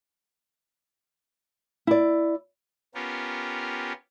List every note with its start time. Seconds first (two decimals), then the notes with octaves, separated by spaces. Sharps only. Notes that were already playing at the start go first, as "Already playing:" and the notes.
1.87 E4 D5
2.95 B3 C#4 F4 G4 A#4